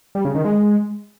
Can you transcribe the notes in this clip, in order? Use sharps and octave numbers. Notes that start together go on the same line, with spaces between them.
G3
C#3
D#3
G#3